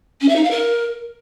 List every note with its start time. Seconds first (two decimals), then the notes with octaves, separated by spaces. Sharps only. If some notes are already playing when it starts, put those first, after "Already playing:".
0.21 C#4
0.29 E5
0.36 D#4
0.43 F5
0.51 A#4